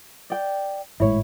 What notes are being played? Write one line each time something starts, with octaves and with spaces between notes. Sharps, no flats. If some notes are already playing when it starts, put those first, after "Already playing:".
D5 G5
G#1 A2 G#3 E4 C#5